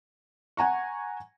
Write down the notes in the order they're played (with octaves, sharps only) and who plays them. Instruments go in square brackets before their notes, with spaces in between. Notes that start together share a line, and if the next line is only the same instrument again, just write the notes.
[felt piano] F#5 G#5 A#5 C#6